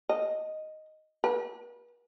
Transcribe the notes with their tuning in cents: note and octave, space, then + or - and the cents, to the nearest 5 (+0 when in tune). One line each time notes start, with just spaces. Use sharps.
D#5 +0
B4 -45